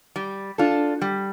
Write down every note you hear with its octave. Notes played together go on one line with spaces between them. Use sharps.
G3
D4 F4 A4
G3